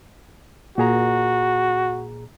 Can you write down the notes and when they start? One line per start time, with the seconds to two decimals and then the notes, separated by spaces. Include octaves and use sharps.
0.78 A#2 F#4 G#4 A#5